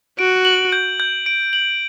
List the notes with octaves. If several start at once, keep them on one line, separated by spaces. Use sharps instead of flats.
F#4 D7
F#7
G6
G6
D7
F#7